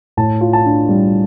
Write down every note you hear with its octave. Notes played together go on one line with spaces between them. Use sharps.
A2 A5
F4
A5
D4
G3